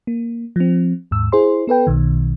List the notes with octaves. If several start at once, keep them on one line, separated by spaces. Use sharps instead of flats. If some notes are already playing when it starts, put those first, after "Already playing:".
A#3
F3 C4
D#2 G#2 E6
E4 G#4 C5 C6
B3 A4 B4 G5
B1 B2 D#3